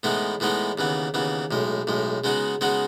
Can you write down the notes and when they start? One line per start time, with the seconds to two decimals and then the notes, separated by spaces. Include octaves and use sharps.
0.03 A2 E3 G#3 B3 D#4
0.40 A2 E3 G#3 B3 D#4
0.78 D#2 C#3 E3 B3
1.14 D#2 C#3 E3 B3
1.51 B1 A2 G#3
1.87 B1 A2 G#3
2.24 C#3 G#3 B3 D#4 F#4
2.61 C#3 G#3 B3 D#4 F#4